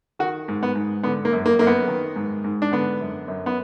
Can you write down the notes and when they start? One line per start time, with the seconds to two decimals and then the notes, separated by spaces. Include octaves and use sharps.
0.19 D#3 F#4
0.48 G#2
0.63 B3
0.75 G#2
1.03 D3 B3
1.25 A#3
1.32 F#2
1.46 A#3
1.59 F#2 A#3
1.67 B3
1.88 D#3
2.16 G#2
2.44 G#2
2.62 D4
2.72 D3 B3
3.01 F#2
3.28 F#2
3.46 B3